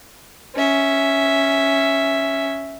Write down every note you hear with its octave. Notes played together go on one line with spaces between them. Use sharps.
C#4 E5